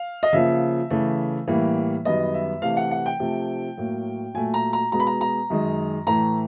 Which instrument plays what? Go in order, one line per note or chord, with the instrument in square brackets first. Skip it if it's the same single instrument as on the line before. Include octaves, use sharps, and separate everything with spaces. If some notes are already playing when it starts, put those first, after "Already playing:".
Already playing: [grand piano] F5
D#5
C#3 F3 A#3 E5
C#3 E3 A3
A2 E3 G3 A#3
F#2 D#3 G3 B3 D#5
E5
C3 E3 A3 F5
F#5
F#5
G5
C3 F3 A3
A2 F#3 A#3
A#2 F#3 A3 G#5
A#5
A#5
B2 G#3 B3 A#5
B5
A#5
A#5
F#2 D#3 G#3
A2 E3 A3 A#5